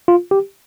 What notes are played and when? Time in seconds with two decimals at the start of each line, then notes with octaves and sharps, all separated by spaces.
0.08 F4
0.31 G4